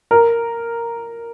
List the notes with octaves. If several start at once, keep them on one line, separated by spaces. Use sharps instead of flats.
A#4